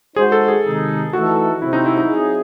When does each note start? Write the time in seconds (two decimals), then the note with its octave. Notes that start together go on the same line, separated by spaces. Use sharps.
0.16 G#3 D#4 F#4 G#4 C5
0.32 A4
0.48 G#4
0.64 C3 D#3 G#3 D#4
1.13 E3 A3 D#4 F#4 A4
1.61 C3 F#3 C4 E4
1.73 D#4
1.86 E4
1.98 D#4
2.09 F#3 C4 E4 G#4